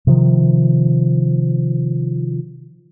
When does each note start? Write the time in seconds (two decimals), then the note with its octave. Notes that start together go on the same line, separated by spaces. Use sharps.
0.07 C3 D#3 F3